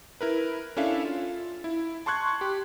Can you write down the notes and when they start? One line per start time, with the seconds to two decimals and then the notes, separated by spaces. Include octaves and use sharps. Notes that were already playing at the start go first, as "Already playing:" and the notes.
0.21 E4 A#4 B4
0.77 C#4 D4 E4 A4 E5 F5
1.05 F4
1.64 E4
2.06 A5 C6 C#6 F#6 G#6
2.41 G4